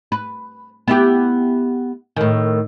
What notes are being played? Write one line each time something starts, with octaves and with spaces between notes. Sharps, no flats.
B4
B3 E4 G4
A2 D#3